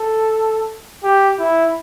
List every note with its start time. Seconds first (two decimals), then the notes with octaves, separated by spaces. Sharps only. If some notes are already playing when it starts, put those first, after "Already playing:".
Already playing: A4
1.04 G4
1.39 E4